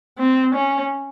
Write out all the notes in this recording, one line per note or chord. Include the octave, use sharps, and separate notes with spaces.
C4
C#4